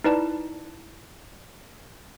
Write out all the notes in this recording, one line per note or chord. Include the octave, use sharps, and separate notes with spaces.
D#4 E4 B4 D5 A5